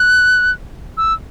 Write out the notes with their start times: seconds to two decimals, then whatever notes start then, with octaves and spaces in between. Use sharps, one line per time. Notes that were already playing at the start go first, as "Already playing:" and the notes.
Already playing: F#6
0.98 E6